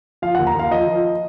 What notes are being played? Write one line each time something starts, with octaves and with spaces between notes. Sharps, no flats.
F3 F5
F#5
D#2
A#5
D#2 F5
F3 D#5
F3